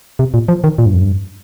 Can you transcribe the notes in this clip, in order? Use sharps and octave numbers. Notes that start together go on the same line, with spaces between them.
C3
A#2
F3
D#3
A#2
G2
F2
G2